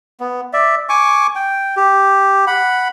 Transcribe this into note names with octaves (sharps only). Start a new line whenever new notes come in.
B3
D5 E5
G#5 C#6 D6
G5
G4
F#5 B5